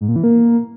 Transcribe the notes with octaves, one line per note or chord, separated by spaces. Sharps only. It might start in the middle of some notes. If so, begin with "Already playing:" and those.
G#2
A#2
E3
A#3